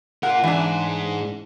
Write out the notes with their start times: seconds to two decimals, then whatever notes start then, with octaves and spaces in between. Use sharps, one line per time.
0.23 F4 A#4 F#5
0.44 G#2 E3 D4 G#5